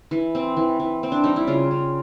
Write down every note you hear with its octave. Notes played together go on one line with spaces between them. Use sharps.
E3
C4
E3
E3
C4
D4
G3 D#4
E4
C#3 F4
C#3